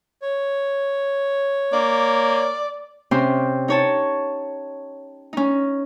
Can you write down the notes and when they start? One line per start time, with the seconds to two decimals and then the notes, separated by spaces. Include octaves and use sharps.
0.22 C#5
1.73 A#3 D5
3.11 C3 C4 C#4 C6
3.68 D#4 C#5 A5
5.33 C#4 D#4